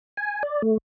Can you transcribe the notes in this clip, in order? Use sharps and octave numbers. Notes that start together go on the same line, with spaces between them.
G#5
D5
A3